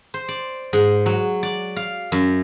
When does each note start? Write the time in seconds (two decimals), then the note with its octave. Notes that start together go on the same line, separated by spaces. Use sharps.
0.14 C5
0.28 D5
0.73 G#2
1.06 F#3
1.43 D5
1.76 F5
2.12 F#2